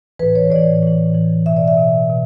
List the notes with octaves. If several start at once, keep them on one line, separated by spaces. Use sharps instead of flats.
A2 E3 B4
C#5
A2 E3 D5
A2 E3
A2 E3
B2 E5
D5
E5
B2
B2